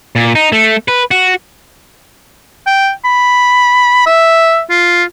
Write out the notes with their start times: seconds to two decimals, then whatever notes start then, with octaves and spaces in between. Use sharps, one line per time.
0.16 A#2
0.35 D#4
0.52 A3
0.88 B4
1.11 F#4
2.67 G5
3.05 B5
4.06 E5
4.70 F4